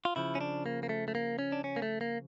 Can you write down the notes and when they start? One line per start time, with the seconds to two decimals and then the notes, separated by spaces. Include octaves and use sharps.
0.05 F4
0.16 C#3 F3 E4
0.35 C#4
0.41 D4
0.66 A#3
0.83 A#3
0.89 A3
1.08 A3
1.15 A#3
1.39 C#4
1.52 D4
1.64 C#4
1.76 A#3
1.82 A3
2.01 A#3